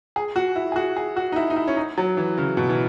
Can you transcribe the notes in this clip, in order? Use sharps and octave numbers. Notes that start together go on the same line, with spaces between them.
G#4
F#4
E4
G#4
F#4
G#4
F#4
D#4
E4
D#4
E4
C#4
D#4
F#3
E3
C#3
B2
E3